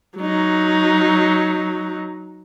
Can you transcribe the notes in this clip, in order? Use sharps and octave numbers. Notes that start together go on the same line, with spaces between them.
F#3 D#4